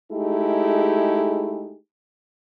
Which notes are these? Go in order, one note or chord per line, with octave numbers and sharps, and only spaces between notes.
G#3 A3 D#4 E4 G4 G#4